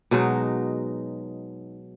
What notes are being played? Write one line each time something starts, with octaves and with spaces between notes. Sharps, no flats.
B2 F#3 G#3 D#4